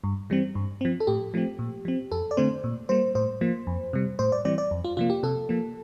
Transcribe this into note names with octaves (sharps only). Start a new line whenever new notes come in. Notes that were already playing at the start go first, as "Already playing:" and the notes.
G2
E3 G3 C4
G2
F3 C4
A4
A2 G4
F3 A3 C4
A#2
F3 C4
F2 A4
D5
D3 A3 C4 C5
A#2
G3 A#3 C5
A2 C5
F3 A#3
F2
C3 G3
A2 C5
D5
E3 G3 C4 D5
D5
F2
F4
C3 F3 A#3 F4
G4
C3 A4
F3 A#3